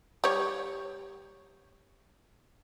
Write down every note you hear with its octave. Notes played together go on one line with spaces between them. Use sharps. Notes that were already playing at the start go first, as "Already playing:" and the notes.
G3 C#5